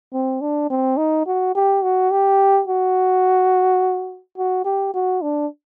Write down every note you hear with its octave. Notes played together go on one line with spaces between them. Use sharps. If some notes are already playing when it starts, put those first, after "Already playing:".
C4
D4
C4
D#4
F#4
G4
F#4
G4
F#4
F#4
G4
F#4
D4